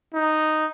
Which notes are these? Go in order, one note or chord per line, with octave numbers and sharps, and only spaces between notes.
D#4